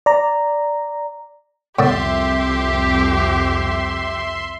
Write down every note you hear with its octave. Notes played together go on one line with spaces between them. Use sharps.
D5 A#5
C2 F2 A2 D3 G4 D5 E5 C6